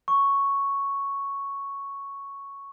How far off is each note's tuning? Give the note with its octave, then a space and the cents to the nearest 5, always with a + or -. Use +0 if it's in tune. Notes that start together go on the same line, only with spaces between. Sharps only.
C#6 +0